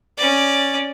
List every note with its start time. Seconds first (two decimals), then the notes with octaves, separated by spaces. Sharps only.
0.18 C#4 D5